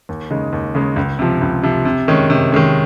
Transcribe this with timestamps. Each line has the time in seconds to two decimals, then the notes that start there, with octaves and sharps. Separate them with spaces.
0.09 D#2
0.31 C#3 G#3 D#4
0.53 D#2
0.75 C#3 G#3 D#4
0.96 C#2
1.19 C3 F3
1.41 C#2
1.63 C3 F3
1.85 C3
2.08 D#3 G#3 C#4
2.30 C3
2.52 D#3 G#3 C#4